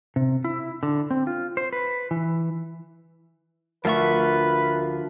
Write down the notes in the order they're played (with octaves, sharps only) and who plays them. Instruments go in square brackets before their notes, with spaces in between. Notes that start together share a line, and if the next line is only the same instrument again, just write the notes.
[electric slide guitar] C3
E4
D3
C4
F4
C5
B4
E3
[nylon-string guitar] D2 [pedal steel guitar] F3 F4 C#6 [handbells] A#4 E5 [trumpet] B4